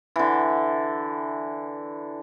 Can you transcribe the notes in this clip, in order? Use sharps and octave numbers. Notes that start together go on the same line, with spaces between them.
D3 E3